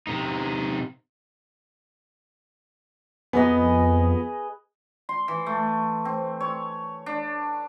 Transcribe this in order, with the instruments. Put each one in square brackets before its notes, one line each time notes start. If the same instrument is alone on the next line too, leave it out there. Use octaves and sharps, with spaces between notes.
[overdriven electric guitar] C3 D#4
[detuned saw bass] F2 [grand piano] B3 [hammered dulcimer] G#4 B4 D#5
[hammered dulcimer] C6
E3
A3
C4
C#5
D4